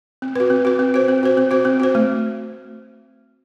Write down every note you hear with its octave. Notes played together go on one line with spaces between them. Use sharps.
C4
F#4 B4
C4
F#4 B4
C4
F#4 C5
C4
F#4 C5
C4
F#4 C5
C4
F#4 C5
A3